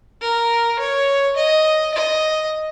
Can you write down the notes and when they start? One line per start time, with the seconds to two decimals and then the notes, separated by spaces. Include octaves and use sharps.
0.21 A#4
0.79 C#5
1.36 D#5
1.94 D#5